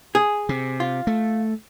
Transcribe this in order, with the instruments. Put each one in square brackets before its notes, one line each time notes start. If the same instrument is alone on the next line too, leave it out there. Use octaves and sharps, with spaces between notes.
[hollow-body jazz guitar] G#4
[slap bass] C3
[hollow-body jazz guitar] F4
[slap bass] A3